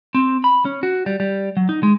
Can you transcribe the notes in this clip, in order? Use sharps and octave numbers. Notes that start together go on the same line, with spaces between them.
C4
B5
C#4
F#4
G3
G3
F#3
D#4
G#3